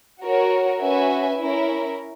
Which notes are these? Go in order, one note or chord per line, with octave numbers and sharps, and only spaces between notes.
F#4 A#4 C#5
C#4 F#4 B4 E5 G#5
C#4 E4 A#4